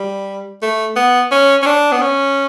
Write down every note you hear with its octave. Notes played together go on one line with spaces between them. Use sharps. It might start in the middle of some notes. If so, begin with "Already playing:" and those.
Already playing: G3
A3
B3
C#4
C#4
D4
B3
C#4